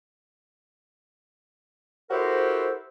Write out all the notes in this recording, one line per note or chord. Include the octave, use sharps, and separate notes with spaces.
E4 F#4 G4 A4 A#4 C5